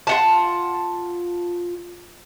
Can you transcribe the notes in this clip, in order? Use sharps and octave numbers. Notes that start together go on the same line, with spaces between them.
F4 F#5 A5